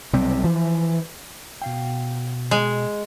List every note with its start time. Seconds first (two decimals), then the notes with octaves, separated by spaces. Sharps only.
0.13 B1 C3 G3 C4
0.44 E3 F3
1.62 B2 F5 G5
2.51 G#3